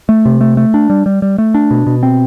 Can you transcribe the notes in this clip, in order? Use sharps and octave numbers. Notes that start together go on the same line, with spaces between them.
A3
C3
A3
A3
D4
G3
G3
G3
A3
D4
B2
B2
C4